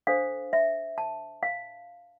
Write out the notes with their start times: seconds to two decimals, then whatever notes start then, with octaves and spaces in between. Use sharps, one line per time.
0.07 D4 A4 C5 F5
0.53 E5
0.98 A5
1.43 F5